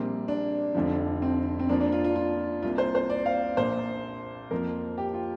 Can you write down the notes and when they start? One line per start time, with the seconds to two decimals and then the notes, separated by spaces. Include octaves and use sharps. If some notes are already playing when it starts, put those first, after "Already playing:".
Already playing: A#1 A#2 G3 A#3 C4
0.28 D4
0.74 F1 F2 D3 F3
1.22 C4
1.59 C4
1.69 F2 F3 A#3 D4
1.80 D4
1.92 F4
2.04 F4
2.16 F4
2.62 C2 C3 A#3 F4
2.78 C5
2.95 C5
3.10 D5
3.26 F5
3.57 A#1 A#2 F3 A#3 C5
4.51 F2 F3 A#3 A#4
4.98 G4
5.14 F4